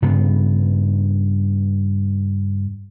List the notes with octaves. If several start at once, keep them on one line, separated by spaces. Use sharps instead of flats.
G2 C#3 B3